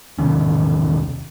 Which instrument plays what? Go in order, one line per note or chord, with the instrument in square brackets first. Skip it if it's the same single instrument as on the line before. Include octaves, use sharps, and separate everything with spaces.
[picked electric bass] E1 C3 D#3 C#4